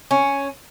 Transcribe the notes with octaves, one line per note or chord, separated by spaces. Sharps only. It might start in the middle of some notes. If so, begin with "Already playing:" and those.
C#4